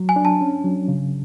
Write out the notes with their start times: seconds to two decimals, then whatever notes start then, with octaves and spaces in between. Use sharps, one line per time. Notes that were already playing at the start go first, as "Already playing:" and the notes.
Already playing: F#3
0.09 G#5
0.16 D4
0.25 A5
0.41 C#4
0.64 F#3
0.88 C#3